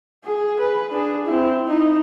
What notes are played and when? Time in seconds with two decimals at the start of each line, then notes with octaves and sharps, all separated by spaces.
0.25 G#4
0.60 B4
0.91 D4 G#4
1.26 C4 E4
1.67 D#4 E4